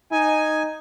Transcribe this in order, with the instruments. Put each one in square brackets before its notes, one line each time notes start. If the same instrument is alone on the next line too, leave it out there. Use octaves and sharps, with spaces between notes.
[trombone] D#4 [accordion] G#5